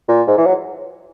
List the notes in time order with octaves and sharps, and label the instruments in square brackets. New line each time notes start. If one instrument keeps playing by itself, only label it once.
[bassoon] A#2
G#2
E3
F#3